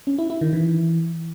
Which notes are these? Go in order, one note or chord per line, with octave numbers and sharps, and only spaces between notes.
C#4
E4
E4
D#3
E3